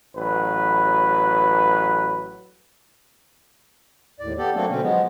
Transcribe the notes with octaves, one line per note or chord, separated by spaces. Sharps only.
A1 F#3 B4
D#2 A2 D5
B3 G4 A4 D5
F#3 A3 A#3 C4 D4 A4
B2 D3 C4 C#4
F3 F#3 G#3 B3